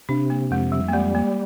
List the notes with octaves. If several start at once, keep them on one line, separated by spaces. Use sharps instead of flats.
C3 D4
A#3
F2 G#3
G3
A#3
G3 G#3
A#3